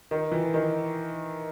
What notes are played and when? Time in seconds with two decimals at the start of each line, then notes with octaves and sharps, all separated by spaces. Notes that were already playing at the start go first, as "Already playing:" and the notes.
0.11 D#3
0.32 E3
0.54 D#3